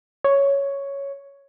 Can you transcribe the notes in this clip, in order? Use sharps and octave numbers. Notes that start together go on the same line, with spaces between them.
C#5